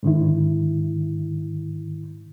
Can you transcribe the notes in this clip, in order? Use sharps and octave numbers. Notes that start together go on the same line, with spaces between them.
G#2 D3 D#3 E4